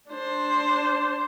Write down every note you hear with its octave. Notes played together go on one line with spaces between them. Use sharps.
D4 C5